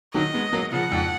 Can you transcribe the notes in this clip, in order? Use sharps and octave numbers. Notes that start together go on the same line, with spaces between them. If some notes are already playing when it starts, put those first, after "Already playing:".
D#3 F#3 D#5
G#3 B3
F#3 A#3
C#3 F3 F#5
F2 G#2